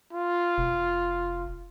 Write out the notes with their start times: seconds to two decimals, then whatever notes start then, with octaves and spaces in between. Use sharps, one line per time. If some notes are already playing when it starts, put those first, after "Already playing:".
0.13 F4
0.58 F1